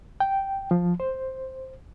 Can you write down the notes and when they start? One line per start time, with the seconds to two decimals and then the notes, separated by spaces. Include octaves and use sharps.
0.20 G5
0.71 F3
1.00 C5